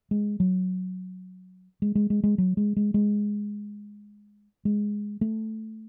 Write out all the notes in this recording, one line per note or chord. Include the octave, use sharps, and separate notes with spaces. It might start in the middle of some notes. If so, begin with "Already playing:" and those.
G#3
F#3
G#3
G#3
G#3
G#3
F#3
G#3
G#3
G#3
G#3
A3